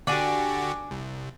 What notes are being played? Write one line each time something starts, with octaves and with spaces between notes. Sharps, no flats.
D3 D4 F#4 G4 D5 G#5
C2